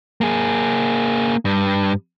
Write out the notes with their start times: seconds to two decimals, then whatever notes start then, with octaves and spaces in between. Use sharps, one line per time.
0.21 A#3 G#4
1.45 G2